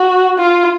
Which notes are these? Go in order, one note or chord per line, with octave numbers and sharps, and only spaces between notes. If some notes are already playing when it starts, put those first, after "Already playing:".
Already playing: F#4
F4